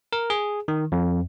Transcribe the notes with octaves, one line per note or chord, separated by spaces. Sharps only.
A#4
G#4
D#3
F2